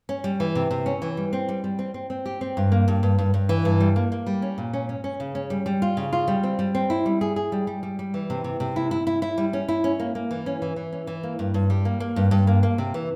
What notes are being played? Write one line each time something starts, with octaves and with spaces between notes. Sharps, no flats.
C#4
G3
E3
C3
C3
C#4
E3
G3
C4
G3
G3
C4
C4
C4
G4
C4
G2
A#3
G2
G2
G2
G2
E3
G2
G3
A#3
A#3
G3
C#4
A#2
C#4
C#4
C#4
C#3
C#4
G3
G3
F4
C#3
F4
G3
C4
G3
C4
E4
G3
G#4
G#4
G3
G3
G3
G3
E3
C3
C3
C3
E4
E4
E4
E4
G3
C#4
E4
C#4
A#3
A#3
E3
C#4
E3
E3
C#4
E3
A#3
G2
G2
G3
A#3
A#3
G2
G2
A#3
A#3
C3
E3